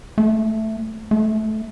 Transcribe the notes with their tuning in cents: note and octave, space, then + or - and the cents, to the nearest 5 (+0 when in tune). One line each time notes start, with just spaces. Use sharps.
A3 +0
A3 -15